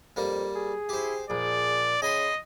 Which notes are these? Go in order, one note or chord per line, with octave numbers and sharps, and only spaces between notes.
F2 G3 A#3
G#4
E4 G4 C5
A#1 G#4 D5
C#3 D#5 G#5 B5 C6